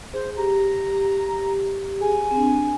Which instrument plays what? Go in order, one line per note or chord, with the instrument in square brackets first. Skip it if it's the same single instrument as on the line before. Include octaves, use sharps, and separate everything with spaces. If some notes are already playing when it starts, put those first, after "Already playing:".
[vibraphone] G#4 [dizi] C5
[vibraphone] G4 [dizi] A#5
[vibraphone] G#4 [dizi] G#5
[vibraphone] C4
D4